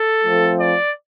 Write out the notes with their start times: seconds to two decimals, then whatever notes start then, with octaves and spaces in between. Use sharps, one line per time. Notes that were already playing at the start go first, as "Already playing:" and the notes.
Already playing: A4
0.23 F2 F3 A3 C4
0.59 D5